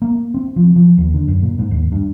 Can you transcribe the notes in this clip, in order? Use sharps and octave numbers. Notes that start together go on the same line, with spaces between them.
A#3
C4
F3
F3
D#2
D3
F#2
A#2
G#2
D#2
G2